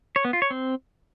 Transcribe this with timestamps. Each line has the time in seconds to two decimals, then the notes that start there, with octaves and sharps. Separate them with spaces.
0.16 C#5
0.25 B3
0.33 F4
0.42 C#5
0.50 C4